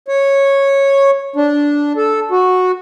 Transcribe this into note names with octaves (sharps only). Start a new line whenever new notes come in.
C#5
D4
A4
F#4